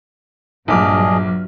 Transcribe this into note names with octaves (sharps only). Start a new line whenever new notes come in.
A#1 G2 F#3 D4 G#4 D#5 D6 F6